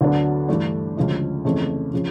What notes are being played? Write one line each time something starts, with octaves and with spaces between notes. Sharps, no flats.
D2 D3 F#3 B3 D4
G2 E3 A3 D4
D2 C#3 F3 G#3
F2 C#3 E3 A3
C#3 F3